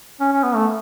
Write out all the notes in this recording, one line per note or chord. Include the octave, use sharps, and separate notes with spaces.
C#4
C#4
B3
A3